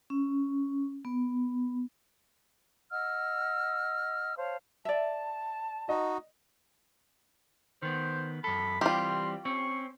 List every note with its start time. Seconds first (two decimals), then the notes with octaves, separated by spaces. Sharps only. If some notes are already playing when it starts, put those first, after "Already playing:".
0.10 C#4
1.05 B3
2.91 D#5 F#5 E6 F6
4.36 C5 C#5 F5 A5
4.85 D5 E5 A5
5.89 D#4 F#4 D#5
7.82 D#3 B3 C5
8.44 F#2 A4 B5
8.81 E3 G3 C4 F4 G4 C6
9.45 C4 C#4 C#6